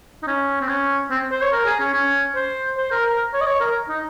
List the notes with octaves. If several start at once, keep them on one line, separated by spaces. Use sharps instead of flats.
D#4
C#4
C4
C#4
C4
C5
C#5
A#4
G#4
C#4
C#4
C5
C5
A#4
A#4
C#5
D#5
C#5
A#4
D#4